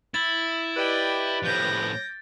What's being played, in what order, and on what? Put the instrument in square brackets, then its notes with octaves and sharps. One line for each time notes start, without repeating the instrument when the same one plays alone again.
[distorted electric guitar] E4 [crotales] A6
[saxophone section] G4 B4 [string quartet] D5 D#5 G5
[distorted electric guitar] A2 F3 [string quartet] D6 G6 A#6